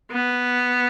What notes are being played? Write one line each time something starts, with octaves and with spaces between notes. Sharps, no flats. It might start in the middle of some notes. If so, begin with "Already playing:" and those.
B3